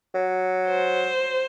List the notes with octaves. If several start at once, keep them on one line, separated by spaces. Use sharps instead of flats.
F#3
C5